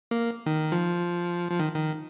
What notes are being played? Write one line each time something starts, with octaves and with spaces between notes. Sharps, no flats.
A#3
D#3
F3
F3
D#3
D#3